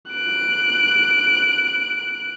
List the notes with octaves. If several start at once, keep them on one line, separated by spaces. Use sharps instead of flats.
F#6 D7